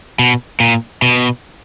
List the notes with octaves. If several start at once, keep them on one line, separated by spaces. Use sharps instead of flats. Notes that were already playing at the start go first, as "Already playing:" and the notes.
B2
A#2
B2